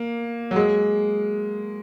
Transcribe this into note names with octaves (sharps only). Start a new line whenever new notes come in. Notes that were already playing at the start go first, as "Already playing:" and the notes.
Already playing: A#3
F#3
G#3